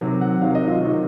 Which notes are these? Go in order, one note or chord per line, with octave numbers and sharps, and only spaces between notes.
C3 D#3 F#3
F#5
C3 D#3 F#3 F5
D#5
F4
C3 D#3 F#3 F#4